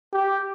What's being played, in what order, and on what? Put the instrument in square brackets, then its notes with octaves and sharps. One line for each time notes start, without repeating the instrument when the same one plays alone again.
[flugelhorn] G4